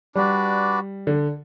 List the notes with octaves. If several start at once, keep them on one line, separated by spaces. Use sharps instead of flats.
G3 D4 F#4 B4 D5
D3